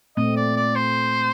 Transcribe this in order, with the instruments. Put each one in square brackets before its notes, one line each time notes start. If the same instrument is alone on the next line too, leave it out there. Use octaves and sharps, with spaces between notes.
[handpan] A#2 A3 C4 [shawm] D#5
[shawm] D5
D5
C5